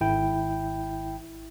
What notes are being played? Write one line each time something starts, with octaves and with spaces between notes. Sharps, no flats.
G#1 E4 G5